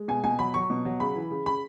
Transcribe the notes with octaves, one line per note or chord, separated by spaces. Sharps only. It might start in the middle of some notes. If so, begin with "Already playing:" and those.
Already playing: G#3
B2 G#5
B2 G#5
F#3 B5
F#3 C#6
B2
F#3
C#3 B5
E3
C#3
C#3 B5